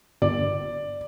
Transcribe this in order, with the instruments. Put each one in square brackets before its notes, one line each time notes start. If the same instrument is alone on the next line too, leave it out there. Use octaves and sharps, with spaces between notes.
[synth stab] G1 [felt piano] D5